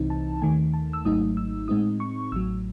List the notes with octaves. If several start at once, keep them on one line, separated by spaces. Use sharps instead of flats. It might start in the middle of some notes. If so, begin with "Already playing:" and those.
Already playing: C2 C3 E3 C4 D#4
A5
D#2 D#3 A3 G#5
A5
E6
G#1 G#2 F#3 A3 D#4 D#6
E6
A2 G#3 C4 D#4 D#6
C#6
A1 A2 F#3 E6